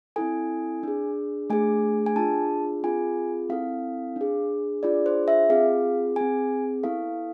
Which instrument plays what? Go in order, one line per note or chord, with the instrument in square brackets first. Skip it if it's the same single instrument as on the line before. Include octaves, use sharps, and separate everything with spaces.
[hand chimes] C4 E4 A4 G#5
D4 G#4
A3 D4 G#4 G#5
G#5
D4 F4 G#4 A5
C4 F4 G#4 G#5
C4 E4 A4 F5
D4 G#4
D4 F4 G#4 D5
C5
E5
C4 F4 G#4 F5
C4 G#4 G#5
B3 E4 A4 F5